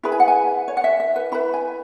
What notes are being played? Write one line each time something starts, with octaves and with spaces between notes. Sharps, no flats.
E4 G#4 B4 B5
G#5
F#5
G#5
C#5
F#5
E5
E5
B4
E4 B4 B5
G#5